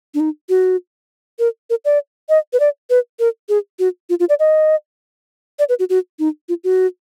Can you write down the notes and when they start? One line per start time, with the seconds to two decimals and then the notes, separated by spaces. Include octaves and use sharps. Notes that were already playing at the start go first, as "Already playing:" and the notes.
0.14 D4
0.20 D#4
0.49 F#4
1.39 A#4
1.70 A#4
1.85 D5
2.29 D#5
2.53 B4
2.60 D5
2.90 B4
3.20 A#4
3.49 G#4
3.79 F#4
4.10 F4
4.20 F4
4.29 D5
4.39 D#5
5.59 D5
5.69 B4
5.79 F#4
5.90 F#4
6.19 D#4
6.49 F4
6.64 F#4